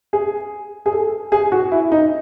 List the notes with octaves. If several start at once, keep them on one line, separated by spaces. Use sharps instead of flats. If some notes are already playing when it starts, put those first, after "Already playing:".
G#4
G#4
A4
G#4
F#4
E4
D#4